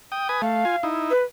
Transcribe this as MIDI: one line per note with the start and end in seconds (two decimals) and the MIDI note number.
0.12 0.28 79
0.12 0.28 87
0.29 0.42 71
0.29 0.42 80
0.29 0.42 87
0.42 0.65 57
0.42 0.85 77
0.65 0.76 65
0.65 0.76 80
0.83 1.13 63
0.83 1.13 64
1.10 1.23 71